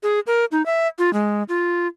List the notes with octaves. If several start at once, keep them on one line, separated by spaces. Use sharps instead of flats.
G#4
A#4
D#4
E5
F4
G#3
F4